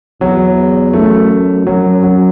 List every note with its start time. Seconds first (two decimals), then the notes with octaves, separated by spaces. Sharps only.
0.21 E2 F#3
0.93 F#2 A3
1.67 F#2 F#3
2.03 F#3